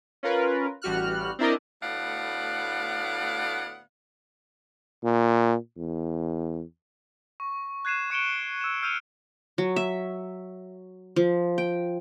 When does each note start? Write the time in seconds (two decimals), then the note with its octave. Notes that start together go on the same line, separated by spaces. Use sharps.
0.23 C#4 F4 A#4 B4
0.82 A1 G3 F#4 F6 F#6
1.39 C4 D4 E4 A#4 D5 D#5
1.82 D2 A2 B3 D5 F5 F#5
5.04 A#2
5.77 E2
7.40 C#6
7.85 F#6 G#6 C7 D#7 E7
8.10 C#6 C#7 D7 E7 G7
8.61 E6 E7
8.82 E6 F6 G6 C#7 D#7 F7
9.58 F#3
9.76 E5
11.16 F3
11.58 G5